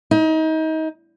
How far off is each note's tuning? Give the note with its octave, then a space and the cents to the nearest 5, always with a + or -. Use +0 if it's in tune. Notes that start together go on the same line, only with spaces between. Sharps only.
D#4 +30